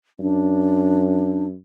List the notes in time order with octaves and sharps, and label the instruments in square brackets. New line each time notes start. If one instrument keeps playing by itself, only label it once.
[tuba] F#2 [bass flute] D4